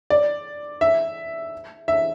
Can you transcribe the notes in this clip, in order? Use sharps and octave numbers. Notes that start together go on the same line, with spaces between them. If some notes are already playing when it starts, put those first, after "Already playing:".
D5
E5
E5